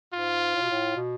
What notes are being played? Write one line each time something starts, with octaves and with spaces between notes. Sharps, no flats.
G#2 F4
A2
B2
A2
B2